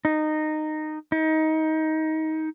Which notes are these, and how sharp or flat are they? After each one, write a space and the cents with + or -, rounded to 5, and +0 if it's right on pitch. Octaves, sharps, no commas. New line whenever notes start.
D#4 -15
D#4 +20